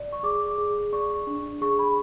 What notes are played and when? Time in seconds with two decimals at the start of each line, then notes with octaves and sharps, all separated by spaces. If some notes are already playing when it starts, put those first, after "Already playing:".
Already playing: D5
0.13 C#6
0.23 G#4 D6
0.58 G#4
0.93 D5 C#6
1.27 D4
1.61 G#4 C#6
1.79 B5